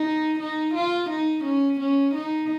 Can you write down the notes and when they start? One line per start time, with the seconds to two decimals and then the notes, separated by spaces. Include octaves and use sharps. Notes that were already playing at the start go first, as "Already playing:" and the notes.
Already playing: D#4
0.40 D#4
0.75 F4
1.10 D#4
1.44 C#4
1.80 C#4
2.15 D#4